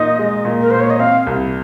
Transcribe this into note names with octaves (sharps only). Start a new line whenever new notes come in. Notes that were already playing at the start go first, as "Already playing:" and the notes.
Already playing: A#2 D#4 D#5
G#3
A#2
A#4
A#2 C5
C#5
D#5
C4 F5
C2